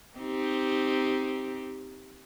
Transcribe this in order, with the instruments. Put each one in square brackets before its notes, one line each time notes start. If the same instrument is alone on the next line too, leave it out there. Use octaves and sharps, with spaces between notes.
[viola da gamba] C4 D#4 G4